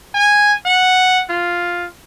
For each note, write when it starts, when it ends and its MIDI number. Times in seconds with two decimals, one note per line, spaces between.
0.15 0.53 80
0.66 1.22 78
1.30 1.86 65